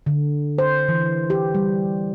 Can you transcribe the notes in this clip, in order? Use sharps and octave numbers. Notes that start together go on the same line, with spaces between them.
D3
C5
E3
G4
G3